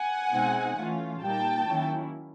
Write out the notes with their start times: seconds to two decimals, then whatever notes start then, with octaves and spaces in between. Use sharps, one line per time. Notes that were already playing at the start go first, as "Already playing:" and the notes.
Already playing: F#5 G#5
0.31 B2 G#3 C4 D#4
0.76 E3 A3 C#4 F4
1.21 A#2 G3 A#3 D#4 G5 A5
1.66 D#3 F#3 A#3 C#4 E4